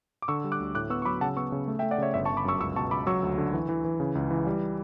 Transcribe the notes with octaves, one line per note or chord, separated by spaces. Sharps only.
D6
D3 C#6 E6
G3
D6 F#6
D2
A2 D6 F#6
B3 C#6 E6
C#6
F#3 B5 D6
C#3 F#5 A5
B3 C#6 E6
C#3
A3
E5 G5
A3
D5 F#5
C#3 C#5 E5
G1 C#5 E5
A5 C#6
G1
B5 D6
F#2 C#6 E6
C#2 C#6 E6
B2 A5 C#6
C#2 B5 D6
F#3 C#6 E6
D2
D3
E3
E3
E3
C#3
C#2
E3
G3